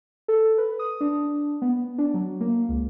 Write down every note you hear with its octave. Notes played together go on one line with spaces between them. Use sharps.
A4
B4
D#6
D4
B3
D4
F#3
A#3
C#2